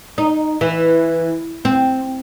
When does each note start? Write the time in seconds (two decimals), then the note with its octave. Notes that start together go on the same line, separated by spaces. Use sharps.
0.18 D#4
0.61 E3
1.65 C4